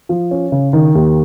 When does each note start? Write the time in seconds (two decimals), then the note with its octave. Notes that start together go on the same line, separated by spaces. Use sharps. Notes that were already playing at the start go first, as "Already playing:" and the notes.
0.09 F3
0.31 C#4
0.52 C#3
0.73 D#3
0.95 D#2